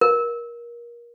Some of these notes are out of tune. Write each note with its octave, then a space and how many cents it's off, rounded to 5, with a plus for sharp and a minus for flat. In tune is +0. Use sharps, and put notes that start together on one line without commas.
A#4 +25